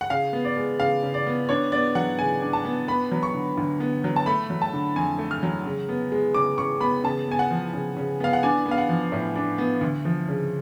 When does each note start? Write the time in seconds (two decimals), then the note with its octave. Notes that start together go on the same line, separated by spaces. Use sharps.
0.01 F#5
0.10 C#3 F5
0.33 B3
0.45 D5
0.57 G#3
0.80 C#3 F5
1.03 C#3
1.14 D5
1.26 B3
1.49 D4 C#5
1.72 B3 D5
1.95 F#3 F#5
2.19 C#3 G#5
2.42 D4
2.53 A5
2.65 B3
2.88 B3 B5
3.11 F#3
3.23 C#6
3.34 D3
3.58 D2
3.80 B3
4.04 F#3
4.16 A5
4.26 A3 B5
4.50 F#3
4.62 A5
4.73 D3
4.96 F2 G#5
5.19 A3
5.31 F6
5.43 F#3
5.66 C#3
5.89 B3
6.12 G#3
6.34 C#3 D6
6.58 C#3 C#6
6.80 B3 B5
7.04 C#3 A5
7.28 B3 G#5
7.39 F#5
7.51 F3
7.74 C#3
7.97 C#3
8.20 B3 F5
8.33 F#5
8.43 D4 G#5
8.65 B3
8.71 F5
8.78 F#5
8.89 F3
9.12 A2
9.35 D4
9.58 B3
9.81 D2
10.05 F3
10.28 C#3